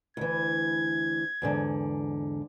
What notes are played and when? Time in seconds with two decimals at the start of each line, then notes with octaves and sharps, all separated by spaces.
0.17 D2 E3 G#6
1.42 E2 G#2 D3